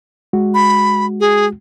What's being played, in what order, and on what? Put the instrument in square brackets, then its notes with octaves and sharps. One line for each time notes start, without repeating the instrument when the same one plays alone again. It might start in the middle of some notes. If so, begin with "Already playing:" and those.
[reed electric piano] G#3 F#4
[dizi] B5
G#4